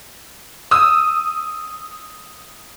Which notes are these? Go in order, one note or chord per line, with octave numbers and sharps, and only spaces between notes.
D#6 E6